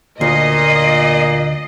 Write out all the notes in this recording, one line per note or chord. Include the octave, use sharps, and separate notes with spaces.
D2 A#2 D#5 C7